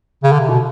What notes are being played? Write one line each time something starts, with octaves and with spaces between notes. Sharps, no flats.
C#3
D3
C3
B2